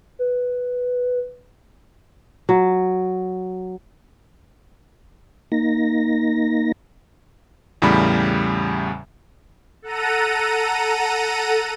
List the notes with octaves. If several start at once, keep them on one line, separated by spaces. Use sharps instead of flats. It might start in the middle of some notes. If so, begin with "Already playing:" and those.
B4
F#3
A#3 D#4 A#6
E2 A2 C#3 G3 B5
A4 F#5 A#5 D#7